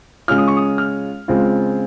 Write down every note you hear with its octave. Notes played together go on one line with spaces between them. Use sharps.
C#3 G#3 C#4 F4 F6
D#6
C#6
D#6
F6
C#3 G#3 C4 F4